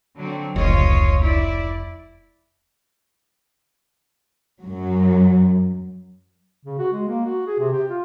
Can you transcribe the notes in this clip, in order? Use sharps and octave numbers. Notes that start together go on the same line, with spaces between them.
D3 F#3 C4
F1 C#2 F4 C#5 D#5
E4 D5
F#2 F#3
C#3
F#4
G#3
A#3
F#4
G#4
C3
G4
F4